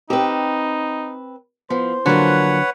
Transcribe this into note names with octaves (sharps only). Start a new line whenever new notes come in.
C4 D#4 G4 B4
F3 B3 C5
D3 F3 F#3 A#3 B4 C#5 F#5